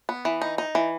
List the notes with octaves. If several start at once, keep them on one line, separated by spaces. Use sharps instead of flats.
B3
E3
D#4
D#4
E3